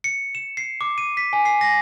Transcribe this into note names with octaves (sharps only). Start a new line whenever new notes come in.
C#7
E7
C7
D6
D#7
B6
G#5
C7
A#6